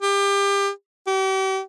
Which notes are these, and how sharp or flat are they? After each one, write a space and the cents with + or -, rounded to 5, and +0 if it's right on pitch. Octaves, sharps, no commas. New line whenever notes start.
G4 +30
G4 -40